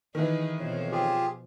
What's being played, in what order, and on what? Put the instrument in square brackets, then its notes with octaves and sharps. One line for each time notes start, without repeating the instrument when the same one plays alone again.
[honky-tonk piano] D#3 E3 [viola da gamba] D#4 G#4 B4
[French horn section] F2 C#5 [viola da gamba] B2 F3 C5
[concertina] F4 G4 G#4